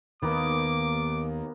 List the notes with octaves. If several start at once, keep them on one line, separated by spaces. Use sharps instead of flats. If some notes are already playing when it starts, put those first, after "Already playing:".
D#2 D#3 A#3 B3 D6